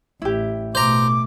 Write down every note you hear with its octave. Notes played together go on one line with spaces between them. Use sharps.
A1 E4 G4
B2 A3 C5 A#5 D6